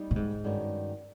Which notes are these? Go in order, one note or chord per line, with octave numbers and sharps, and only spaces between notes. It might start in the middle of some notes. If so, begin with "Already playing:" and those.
Already playing: G3 B3 D#4
A2
G#2
G2 D#3 G#3 C#4 F#4